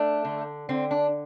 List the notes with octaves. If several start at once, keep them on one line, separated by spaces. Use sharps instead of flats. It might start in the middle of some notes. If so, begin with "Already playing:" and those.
Already playing: A3 D4
D3
D3 C4
D4